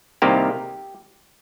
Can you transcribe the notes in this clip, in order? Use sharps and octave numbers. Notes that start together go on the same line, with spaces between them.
C2 C3 D#3 A#3 G4